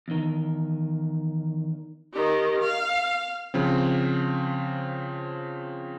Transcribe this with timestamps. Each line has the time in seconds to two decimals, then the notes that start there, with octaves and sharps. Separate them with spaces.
0.08 E2 D#3
2.13 D#3 G4
2.61 F5
3.54 C#3 F3 C4